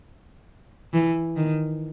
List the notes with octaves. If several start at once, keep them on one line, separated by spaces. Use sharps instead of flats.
E3
D#3